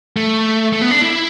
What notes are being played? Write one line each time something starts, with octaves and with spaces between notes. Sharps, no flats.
A3
A3
B3
D4
E4